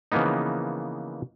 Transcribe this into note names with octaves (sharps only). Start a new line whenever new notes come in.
C#3 E3 F3 A#3 B3 D#4